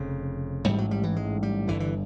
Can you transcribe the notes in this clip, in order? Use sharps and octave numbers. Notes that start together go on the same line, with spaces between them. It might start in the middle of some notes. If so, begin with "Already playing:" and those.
Already playing: F1 F2 C#3
A1 G#2 G3
F#3
G3
E3
G#3
G3
G1 G2 D3 E3
E3